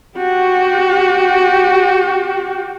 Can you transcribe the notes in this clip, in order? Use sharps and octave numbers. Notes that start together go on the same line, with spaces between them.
F#4 G4